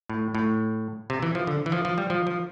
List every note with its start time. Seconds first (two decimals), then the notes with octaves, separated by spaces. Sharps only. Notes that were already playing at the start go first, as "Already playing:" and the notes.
0.10 A2
0.35 A2
1.10 C3
1.23 E3
1.35 F3
1.47 D3
1.66 E3
1.72 F3
1.85 F3
1.98 G3
2.10 F3
2.27 F3